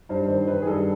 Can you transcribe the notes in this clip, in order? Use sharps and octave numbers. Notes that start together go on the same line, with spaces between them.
G2 C5
D#3 C5
D#3 B4
G#4
G2 A4